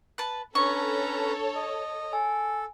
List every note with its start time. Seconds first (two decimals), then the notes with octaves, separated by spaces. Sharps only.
0.18 B4 A5
0.55 C#4 D4 A4 B4 C#5 A#5 C#6
1.55 D#5
2.13 A4 G#5